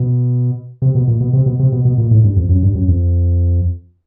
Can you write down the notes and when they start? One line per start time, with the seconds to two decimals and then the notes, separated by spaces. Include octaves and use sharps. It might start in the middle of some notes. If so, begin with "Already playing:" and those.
Already playing: B2
0.82 C3
0.95 B2
1.07 A#2
1.20 B2
1.33 C3
1.46 B2
1.59 C3
1.72 B2
1.85 B2
1.98 A#2
2.11 A2
2.24 G2
2.36 F2
2.49 F#2
2.63 G2
2.75 F#2
2.88 F2